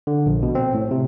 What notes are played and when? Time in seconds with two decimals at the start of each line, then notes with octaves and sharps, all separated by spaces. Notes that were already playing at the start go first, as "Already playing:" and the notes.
0.07 D3
0.26 A#1
0.43 B2
0.55 C4
0.74 A2
0.91 C3